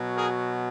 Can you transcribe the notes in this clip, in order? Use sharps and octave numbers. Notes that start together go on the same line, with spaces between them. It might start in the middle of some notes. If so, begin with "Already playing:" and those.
Already playing: B2 F#3
G#4 A#4